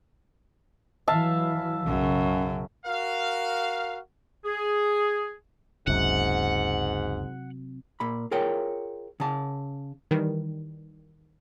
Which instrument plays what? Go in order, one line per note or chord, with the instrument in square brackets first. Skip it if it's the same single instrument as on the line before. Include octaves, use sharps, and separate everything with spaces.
[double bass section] E3 F#3 [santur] E5 F5 A5
[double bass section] B1 C#3 [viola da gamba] F#2
[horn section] F#4 A#4 F5
[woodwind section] G#4
[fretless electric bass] F#1 C#2 [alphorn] G#2 [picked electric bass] C3 F#3 [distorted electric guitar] F#5
[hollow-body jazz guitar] A#2 B5
F4 G#4 A#4 C#5 G5
C#3 A5
[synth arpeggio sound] D#3 E3 G3